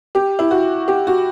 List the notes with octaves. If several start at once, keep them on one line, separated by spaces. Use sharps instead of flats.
G4
E4
F#4
G4
F#4